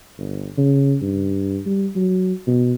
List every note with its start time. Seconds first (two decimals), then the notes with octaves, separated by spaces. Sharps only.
0.18 G1
0.57 C#3
1.02 G2
1.66 G3
1.96 F#3
2.47 B2